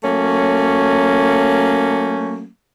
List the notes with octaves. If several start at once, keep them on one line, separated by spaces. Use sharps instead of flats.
F#3 A3 A#3 C#4